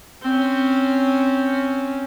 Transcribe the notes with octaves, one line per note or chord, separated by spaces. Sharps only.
C4 C#4